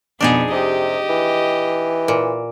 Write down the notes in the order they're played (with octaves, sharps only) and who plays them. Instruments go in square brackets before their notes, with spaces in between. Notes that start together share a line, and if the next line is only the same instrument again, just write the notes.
[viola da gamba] F2 B2 B3 [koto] D4 D#4 G#4
[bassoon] C3 [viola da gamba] G4 D#5
[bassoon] E3
[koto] A#2